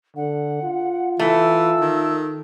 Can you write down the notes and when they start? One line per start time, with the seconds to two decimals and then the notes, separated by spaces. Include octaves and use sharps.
0.16 D3 F#5
0.63 F4
1.19 E3 A3 E6
1.80 D#3